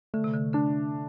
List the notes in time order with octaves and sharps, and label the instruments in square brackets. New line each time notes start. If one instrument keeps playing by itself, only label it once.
[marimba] D3 [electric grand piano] A3
[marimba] C3
D3
[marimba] D3 [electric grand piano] D4